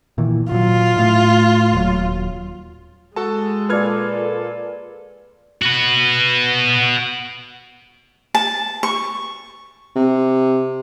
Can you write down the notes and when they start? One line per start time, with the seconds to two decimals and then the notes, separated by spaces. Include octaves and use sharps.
0.18 A#2 D#3 E3
0.52 A#2 F#3 F4
0.96 A2 A3
1.73 D#1 F#3
3.16 G#3 F#4 A4 A5
3.69 A#2 F4 A4 B4 D5 F6 G#6
5.62 F#4 B4
8.35 A5
8.83 C#6
9.96 C3